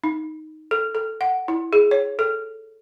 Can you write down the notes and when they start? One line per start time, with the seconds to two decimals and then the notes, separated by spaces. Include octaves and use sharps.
0.04 D#4
0.71 A4
0.95 A4
1.21 F#5
1.48 E4
1.73 G#4
1.91 C#5
2.19 A4